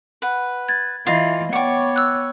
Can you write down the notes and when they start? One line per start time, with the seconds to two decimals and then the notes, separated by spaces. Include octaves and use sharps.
0.22 B4 F#5
0.68 G#6 A6
1.07 E3 F4 D#5 F5 C7
1.53 B3 C#5 D5 F#5 G5 C#6
1.96 E6 F#6